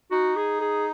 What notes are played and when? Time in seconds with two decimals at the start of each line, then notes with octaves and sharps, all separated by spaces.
0.11 D#4 F#4
0.36 G#4
0.61 G#4